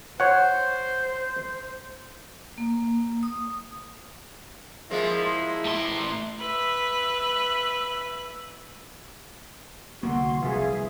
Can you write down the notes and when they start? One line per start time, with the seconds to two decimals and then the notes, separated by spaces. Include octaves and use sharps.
0.20 C5 C#5 F#5
2.58 A#3
3.23 D#6
4.91 F3 G#3 A#3 E4
5.65 A2 C6
6.38 B4 E5
10.03 C2 D3 A#3 F#4 C6 C#6
10.41 F1 C2 E3 G#4 E5 F5